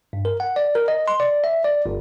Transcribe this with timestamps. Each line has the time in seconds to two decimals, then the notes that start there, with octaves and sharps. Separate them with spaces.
0.13 G2
0.25 A#4
0.40 F#5
0.56 D5
0.75 A#4
0.88 D#5
1.08 C6
1.20 D5
1.44 E5
1.64 D5
1.86 G1